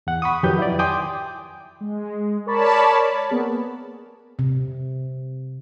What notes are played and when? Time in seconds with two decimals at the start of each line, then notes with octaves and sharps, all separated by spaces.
0.07 E2 F#5
0.22 B5 C#6 D#6
0.43 F2 D#3 F#3 G4 B4 G6
0.59 E4 D5
0.79 G5 G#5 C6 D6 D#6 G6
1.81 G#3
2.46 A#4 C#5 D5 A5 B5
3.30 A#3 B3 G#4 A#4
4.39 C3